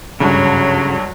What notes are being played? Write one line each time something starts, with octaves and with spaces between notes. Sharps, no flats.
G#1 D2 G2 C#3 F#3